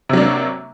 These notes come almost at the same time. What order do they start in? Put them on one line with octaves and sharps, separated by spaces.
C3 F#3 D4 A#3